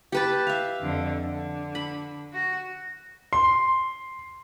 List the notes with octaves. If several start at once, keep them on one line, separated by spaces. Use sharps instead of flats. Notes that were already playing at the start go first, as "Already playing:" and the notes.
G4 B4 A5
E5 F5
F2 D3
D3
B5
F#4
C6